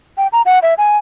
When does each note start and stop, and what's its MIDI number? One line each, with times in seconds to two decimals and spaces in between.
0.18 0.27 79
0.33 0.42 82
0.46 0.59 78
0.63 0.74 76
0.78 0.97 80